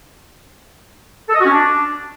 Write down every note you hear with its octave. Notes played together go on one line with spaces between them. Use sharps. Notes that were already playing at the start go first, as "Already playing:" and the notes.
A4
D#5
F#4
C#4
D4